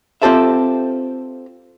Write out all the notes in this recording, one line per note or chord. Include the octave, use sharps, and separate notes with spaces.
C4 F4 G4 A4 C5 E5